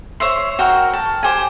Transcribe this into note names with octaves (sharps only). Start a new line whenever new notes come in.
C5 C#5 E5 C6
F#4 A#4 G5 A#5
A5
G4 C5 G5 G#5